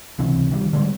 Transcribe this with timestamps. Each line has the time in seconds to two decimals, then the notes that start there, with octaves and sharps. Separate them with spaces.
0.19 C#2 C3 E3
0.51 D#3 F#3 G3
0.73 D3 G3 G#3